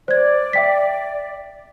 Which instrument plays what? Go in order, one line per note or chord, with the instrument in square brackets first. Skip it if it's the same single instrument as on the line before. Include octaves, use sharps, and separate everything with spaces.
[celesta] C5 G#6 [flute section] D5
[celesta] E5 G5 B6